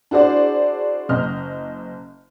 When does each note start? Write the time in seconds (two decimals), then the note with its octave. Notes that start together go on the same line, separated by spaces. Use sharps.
0.11 D4 E4 F#4 G#4 C5 D5
1.09 F#1 D#5 F6